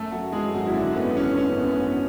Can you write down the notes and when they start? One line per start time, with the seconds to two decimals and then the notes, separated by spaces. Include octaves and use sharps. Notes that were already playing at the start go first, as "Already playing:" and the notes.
Already playing: F#2 A3 A4
0.11 F#3 A3 F#4
0.32 E3 G#3 G#4
0.53 G#1 F#3 F#4
0.66 E4
0.74 F#2 D3 D4
0.95 A3 B3
1.16 E3 C#4
1.37 G#1 C#4
1.58 F#2 B3
1.79 A3 B3